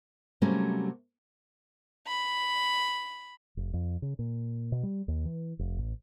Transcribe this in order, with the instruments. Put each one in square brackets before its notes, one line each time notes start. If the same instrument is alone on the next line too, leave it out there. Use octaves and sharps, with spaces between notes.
[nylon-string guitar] C3 F#3 G3 A3 A#3 C#4
[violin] B5
[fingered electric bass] F1
F2
C#3
A#2
B2
G3
D#2
E3
F1
A1